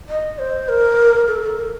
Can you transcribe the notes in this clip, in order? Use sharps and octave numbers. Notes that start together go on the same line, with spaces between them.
D#5
C5
A#4
A4
A4
A#4